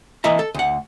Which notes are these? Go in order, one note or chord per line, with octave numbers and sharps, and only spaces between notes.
E3 A#3 D#5 E5 A#5
A4
D2 F#5